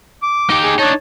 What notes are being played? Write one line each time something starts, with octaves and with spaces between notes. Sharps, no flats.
D6
D#4 G4
G#4
D4 D#4 C#5 A5